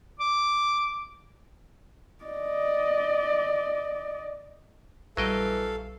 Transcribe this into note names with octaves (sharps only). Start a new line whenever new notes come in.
D6
D5 D#5
A#1 E3 F#3 G3 A4 D#5 F5 G5